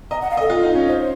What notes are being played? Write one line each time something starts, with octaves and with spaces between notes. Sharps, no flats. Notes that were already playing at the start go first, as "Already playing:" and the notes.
D#5 A#5
F#5
F5
D#5
A4
F4
D#4
C#4
D#4 C5